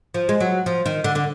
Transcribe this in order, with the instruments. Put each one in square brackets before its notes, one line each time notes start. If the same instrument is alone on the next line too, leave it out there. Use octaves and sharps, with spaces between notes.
[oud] F3
G#3
F#3
F3
D#3
D3
D3